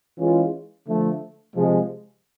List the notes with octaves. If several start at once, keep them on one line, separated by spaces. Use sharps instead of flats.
E3 G#3 C#4 F4
D3 F3 A3
C3 F3 G#3